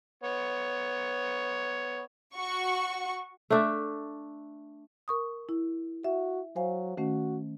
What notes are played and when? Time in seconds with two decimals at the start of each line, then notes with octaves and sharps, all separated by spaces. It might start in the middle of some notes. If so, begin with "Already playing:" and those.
0.24 B3 C#5
2.35 F#4 C#6
3.50 A3 D4 E5
5.08 A#4 C#6 D#6
5.49 E4
6.04 F#4 E5
6.56 F#3 C5 F5 G#5
6.97 D#3 A3 C#4 F#4